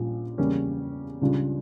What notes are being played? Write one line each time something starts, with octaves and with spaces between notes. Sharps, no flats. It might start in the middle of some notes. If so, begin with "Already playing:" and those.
Already playing: A#1 A#2 G3 C#4 F4
E2 C#3 G3 A#3 C#4
C#2 C#3 G3 D4 F4